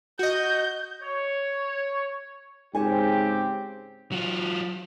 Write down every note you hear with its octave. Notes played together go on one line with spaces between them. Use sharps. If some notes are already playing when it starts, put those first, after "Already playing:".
F#4 D#5 G6
C#5
G#2 C#3 C4 G4 C5 C#5 G#5
F#3 F4